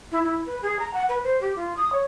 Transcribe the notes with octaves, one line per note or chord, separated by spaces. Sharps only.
E4
E4
B4
G#4
A#5
F#5
B4
C5
G4
F4
D#6
C#5